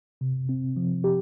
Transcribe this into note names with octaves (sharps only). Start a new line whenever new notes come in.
C3
C4
F3
G4